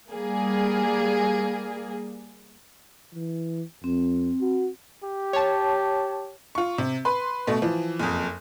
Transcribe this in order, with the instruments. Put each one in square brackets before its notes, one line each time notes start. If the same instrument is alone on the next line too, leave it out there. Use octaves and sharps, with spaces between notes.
[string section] G3 A#3 G#4
[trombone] E3
[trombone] F2 [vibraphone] C4
[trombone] F#4
[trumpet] G4
[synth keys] C#5 A5
[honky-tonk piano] F4 C#6
C3
B4 B5 C6
B2 A3
E3 F3
F#1 F2